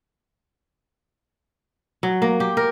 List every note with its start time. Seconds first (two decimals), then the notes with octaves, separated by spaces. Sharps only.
2.03 F#3
2.22 A#3
2.40 G4
2.57 A#4